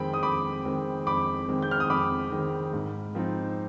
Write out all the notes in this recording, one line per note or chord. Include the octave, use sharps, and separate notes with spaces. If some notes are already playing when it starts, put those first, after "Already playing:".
Already playing: F2 D#3 G#3 C4 G5 B5
D#6
F2 B5 D6
D#3 G#3 C4
F2 B5 D6
D#3 G#3 C4
G6
F6
D#6
F2 B5 D6
D#3 G#3 C4
G#2
F3 C4 D#4